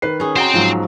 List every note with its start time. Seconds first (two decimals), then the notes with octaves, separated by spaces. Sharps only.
0.02 D#3 B4 C7
0.20 C#4 G#4
0.36 F#4 C5 D#5 G5 A#5
0.54 G#2 F3 F#3